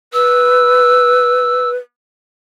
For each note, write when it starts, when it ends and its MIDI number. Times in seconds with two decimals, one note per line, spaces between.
0.14 1.77 71
0.14 1.70 88